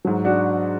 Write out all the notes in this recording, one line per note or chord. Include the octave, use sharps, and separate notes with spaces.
G#2 F#3
D4 F#4